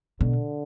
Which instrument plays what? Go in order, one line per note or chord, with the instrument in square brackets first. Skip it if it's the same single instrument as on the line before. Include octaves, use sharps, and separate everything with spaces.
[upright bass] B2 [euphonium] D3